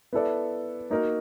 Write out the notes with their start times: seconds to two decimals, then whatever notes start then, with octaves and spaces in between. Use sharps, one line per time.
0.13 B3 E4 A4 D5
0.90 A#3 D#4 F#4 A#4 D#5